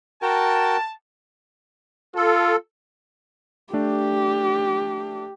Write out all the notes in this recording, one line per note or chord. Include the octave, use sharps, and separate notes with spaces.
F#4 A#4 G5 A5
F4 A4
A3 D4 G4